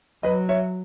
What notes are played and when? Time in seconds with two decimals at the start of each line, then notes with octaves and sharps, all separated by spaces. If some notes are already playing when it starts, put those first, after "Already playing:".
0.23 F#3 B4 D#5
0.49 C#5 E5